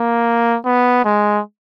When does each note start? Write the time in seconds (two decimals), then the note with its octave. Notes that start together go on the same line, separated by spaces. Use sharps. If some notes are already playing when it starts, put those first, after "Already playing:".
Already playing: A#3
0.65 B3
1.05 G#3